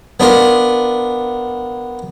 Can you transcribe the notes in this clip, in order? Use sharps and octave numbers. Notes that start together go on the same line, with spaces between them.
B3 D4 F4 A#4